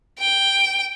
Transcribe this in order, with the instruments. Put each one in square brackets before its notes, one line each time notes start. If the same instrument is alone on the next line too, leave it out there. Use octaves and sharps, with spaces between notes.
[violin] G5